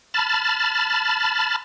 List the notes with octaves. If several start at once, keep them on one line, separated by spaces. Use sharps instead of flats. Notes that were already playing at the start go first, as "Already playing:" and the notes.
A5 B5 F6 A6